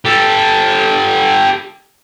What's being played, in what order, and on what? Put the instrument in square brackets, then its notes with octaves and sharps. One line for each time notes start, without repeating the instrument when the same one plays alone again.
[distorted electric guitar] G4 A4